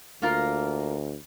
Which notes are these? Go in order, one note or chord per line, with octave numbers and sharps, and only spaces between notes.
D2 A#3 F4 A#4